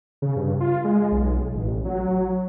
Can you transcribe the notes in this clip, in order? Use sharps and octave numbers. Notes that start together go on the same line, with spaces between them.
C#3
G2
F4
G#3
B1
A1
F#3